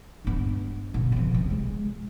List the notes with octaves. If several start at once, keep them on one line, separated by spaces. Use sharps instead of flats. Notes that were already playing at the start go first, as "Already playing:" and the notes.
G2 B3
B2
C#3 F3
C3
G#3